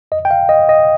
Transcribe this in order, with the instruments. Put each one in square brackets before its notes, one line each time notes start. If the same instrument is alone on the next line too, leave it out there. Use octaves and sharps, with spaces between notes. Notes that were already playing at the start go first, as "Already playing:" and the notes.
[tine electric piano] F2 D#5
G5
F5
G1 D#5
D#5